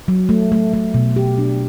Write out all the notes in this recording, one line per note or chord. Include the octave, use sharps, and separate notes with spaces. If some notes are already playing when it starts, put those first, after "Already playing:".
F#3
A3
A3
A3
B2
G4
D4